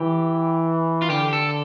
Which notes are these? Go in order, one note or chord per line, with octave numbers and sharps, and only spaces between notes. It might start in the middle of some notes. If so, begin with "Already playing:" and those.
Already playing: E3 G4
F4
D3 G4
A4